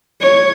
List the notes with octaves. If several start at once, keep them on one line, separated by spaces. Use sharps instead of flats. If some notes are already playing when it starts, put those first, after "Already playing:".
C#5